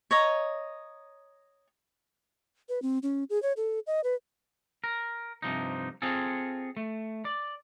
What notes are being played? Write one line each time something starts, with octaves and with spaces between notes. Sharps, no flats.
C#5 D#5 A#5
B4
C4
C#4
G#4
C#5
A4
D#5
B4
A#4
G2 C3 F3 D#4
C4 F4 G#4 A4
A3
D5